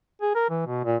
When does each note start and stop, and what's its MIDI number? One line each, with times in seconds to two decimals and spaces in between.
0.22 0.33 68
0.35 0.49 70
0.50 0.66 52
0.67 0.85 47
0.85 0.97 46